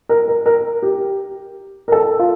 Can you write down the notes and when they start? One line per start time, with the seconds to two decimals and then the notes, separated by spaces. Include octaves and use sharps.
0.09 A#4
0.28 A#4
0.46 A#4
0.82 G4
1.88 A#4
1.92 A4
2.19 F4